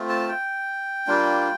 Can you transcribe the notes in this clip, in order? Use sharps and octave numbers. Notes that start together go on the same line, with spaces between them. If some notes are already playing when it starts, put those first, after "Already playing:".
Already playing: A3 C4 F4
A5
G5
G3 A#3 D4 F4